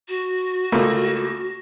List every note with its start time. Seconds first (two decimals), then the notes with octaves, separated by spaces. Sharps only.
0.08 F#4
0.72 C#2 A3 A#3